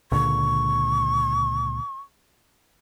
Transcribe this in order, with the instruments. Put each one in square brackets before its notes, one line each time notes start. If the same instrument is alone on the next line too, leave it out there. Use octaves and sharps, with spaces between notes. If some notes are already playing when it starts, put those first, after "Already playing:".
[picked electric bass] C#2 A#2 D3 [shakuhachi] C#6